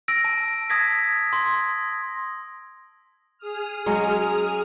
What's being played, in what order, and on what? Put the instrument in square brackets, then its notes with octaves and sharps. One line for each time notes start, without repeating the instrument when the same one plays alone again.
[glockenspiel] E6 A#6 D7
A5
A5 D#6 G#6 A#6 B6
C6
[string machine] G#4 D#6 F6
[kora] F#3 G#3 C#4